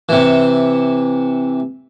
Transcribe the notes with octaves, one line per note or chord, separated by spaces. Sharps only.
C3 E3